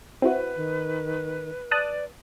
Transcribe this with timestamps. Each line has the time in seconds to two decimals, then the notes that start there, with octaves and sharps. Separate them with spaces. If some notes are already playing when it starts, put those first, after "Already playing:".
0.22 C4 E4 F#4 B4
0.56 D#3
1.71 D5 A5 D#6 F#6